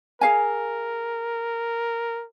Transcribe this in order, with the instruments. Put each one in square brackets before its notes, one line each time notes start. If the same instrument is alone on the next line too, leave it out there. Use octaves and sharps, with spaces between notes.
[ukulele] G#4 F5 G#5 [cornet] A#4